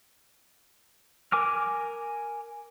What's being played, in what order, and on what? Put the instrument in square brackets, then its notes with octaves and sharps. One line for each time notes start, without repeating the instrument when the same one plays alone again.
[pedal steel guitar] A#4 G#5 D6 F6